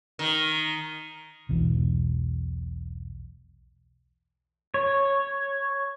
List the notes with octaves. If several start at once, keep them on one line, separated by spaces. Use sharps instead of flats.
D#3
E1 B1 E2
C#5